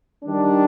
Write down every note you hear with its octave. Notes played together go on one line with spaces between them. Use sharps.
D#3 G3 D4